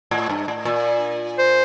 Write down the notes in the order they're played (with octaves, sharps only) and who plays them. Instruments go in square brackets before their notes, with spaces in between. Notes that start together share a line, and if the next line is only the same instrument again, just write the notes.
[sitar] A2
G2
A2
A#2
[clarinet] C5